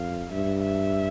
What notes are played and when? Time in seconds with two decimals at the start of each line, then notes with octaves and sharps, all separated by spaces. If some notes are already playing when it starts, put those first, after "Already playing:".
Already playing: F2 F5
0.31 G2 E5
0.63 E5